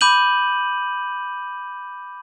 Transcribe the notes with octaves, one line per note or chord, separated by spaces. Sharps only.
B5 D6 G6 D#7 F#7